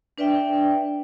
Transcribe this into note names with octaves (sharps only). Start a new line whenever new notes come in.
D4 B4 D5 E5 G5